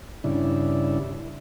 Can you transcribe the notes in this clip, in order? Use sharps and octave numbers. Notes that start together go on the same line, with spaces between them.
G2 C#3 D4 E4